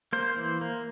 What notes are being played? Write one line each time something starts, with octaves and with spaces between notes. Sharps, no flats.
A#3 C5
E3
A#3